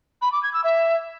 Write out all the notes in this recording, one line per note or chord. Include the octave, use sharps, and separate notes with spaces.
B5
D6
G#6
E6
E5